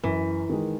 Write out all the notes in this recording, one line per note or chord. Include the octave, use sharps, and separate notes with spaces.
F#2 E3
D#3 G#3